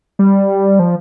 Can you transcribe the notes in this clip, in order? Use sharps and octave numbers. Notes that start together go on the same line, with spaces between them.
G3
F3